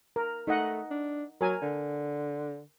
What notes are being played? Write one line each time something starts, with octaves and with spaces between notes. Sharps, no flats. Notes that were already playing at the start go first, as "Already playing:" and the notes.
A#4
A3 D#4 D#5 F#5
D4
F#3 A#4 G#5
D3